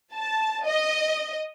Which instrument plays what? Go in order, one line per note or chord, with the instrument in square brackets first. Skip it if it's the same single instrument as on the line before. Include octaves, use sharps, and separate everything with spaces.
[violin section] A5
D#5